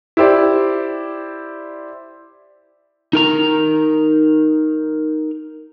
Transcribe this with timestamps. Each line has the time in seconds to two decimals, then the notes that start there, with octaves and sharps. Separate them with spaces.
0.17 E4 G4 C5 D5
3.13 D#4 A#4 A#5